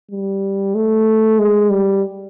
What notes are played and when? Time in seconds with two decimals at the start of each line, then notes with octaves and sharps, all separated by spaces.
0.11 G3
0.75 A3
1.39 G#3
1.70 G3